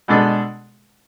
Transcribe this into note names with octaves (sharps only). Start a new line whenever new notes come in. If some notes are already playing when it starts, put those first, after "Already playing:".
B2 G#3 D4 A4